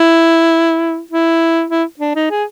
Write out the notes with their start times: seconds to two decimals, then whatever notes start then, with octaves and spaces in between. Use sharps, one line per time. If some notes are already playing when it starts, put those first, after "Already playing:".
Already playing: E4
1.11 E4
1.70 E4
2.00 D4
2.15 D#4
2.30 G#4